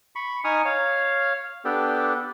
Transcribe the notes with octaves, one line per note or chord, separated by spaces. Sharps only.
B5 C#6
D#4 G#5 C#6 D#6 F6
C#5 F5
B3 D4 G4 A4